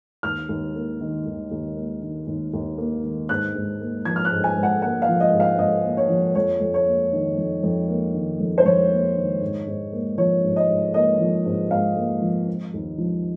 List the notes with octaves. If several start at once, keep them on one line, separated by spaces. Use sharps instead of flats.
D#2 F6
D#2
A#3
D#3
D#2
D#2
A#3
D#3
D#2
D#2
A#3
D#3
G#2 F#6
G#2
A#3
F3 G#6
F6
F#6
G#2
G#5
G#2
F#5
A#3 F#5
F5
F3
D#5
G#2
F5
G#2 D#5
A#3
C#5
F3
F2 C#5
F2
C#5
A#3
D#3
F2
F2
A#3
D#3
F2
C5
F2 C#5
A#3
D#3
G#2
G#2
A#3
F3 C#5
G#2
D#5
G#2
A#3 D#5
F3
G#2
G#2 F5
A#3
F3
C4
D#2
F3